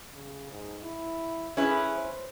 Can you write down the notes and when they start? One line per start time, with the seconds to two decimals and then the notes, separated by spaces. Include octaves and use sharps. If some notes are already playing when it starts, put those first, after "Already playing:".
0.14 C#3
0.52 G#2
0.83 E4
1.57 C#4 E4 G#4 B4
1.96 C5